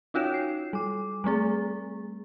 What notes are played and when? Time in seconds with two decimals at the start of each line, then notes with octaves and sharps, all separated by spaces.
0.14 C#4 D#4 F4 F#4 C#5 E7
0.34 C7
0.73 G3 D6
1.24 G3 A3 C4 G#4